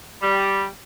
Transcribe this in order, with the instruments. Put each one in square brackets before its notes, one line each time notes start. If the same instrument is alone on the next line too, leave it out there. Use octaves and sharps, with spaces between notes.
[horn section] G3